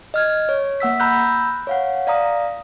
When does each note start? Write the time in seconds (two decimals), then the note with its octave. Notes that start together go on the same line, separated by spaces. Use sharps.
0.14 D#5 F6 G#6
0.49 C#5
0.80 A#3 F#5 E6 B6
1.00 A#5 B5 E6 F#6 G6
1.67 C#5 F5 F#5
2.07 D5 F5 A#5 D#6